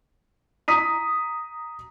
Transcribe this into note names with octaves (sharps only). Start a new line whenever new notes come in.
A#5 D#6 B6 D#7